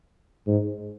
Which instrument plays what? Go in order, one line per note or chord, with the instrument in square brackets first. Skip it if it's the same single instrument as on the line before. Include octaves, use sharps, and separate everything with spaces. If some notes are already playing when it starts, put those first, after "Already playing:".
[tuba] G#2